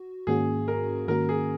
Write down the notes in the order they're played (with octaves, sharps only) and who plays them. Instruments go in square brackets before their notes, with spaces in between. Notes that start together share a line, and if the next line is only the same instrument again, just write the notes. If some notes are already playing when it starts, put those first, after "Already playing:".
Already playing: [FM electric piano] F#4
[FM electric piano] G#2 D#3 A#3 C#4 F#4 [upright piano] G#4
[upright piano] A#4
[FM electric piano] G#2 D#3 A#3 C#4 F#4 [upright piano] A#4
[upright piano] G#4